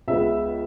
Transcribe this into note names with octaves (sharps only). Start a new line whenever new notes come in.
C#2 C#3 G#3 B3 E5